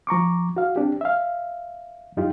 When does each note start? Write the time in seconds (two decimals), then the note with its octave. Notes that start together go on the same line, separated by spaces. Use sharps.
0.07 F3 A#5 C#6 D6
0.57 F#4 F5
0.76 C4 D4 G4
1.01 E5 F5
2.17 F#2 D#4 F4 G4